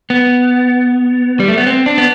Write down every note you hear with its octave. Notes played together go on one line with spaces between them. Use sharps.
B3
G3
A3
B3
C4
D4
B3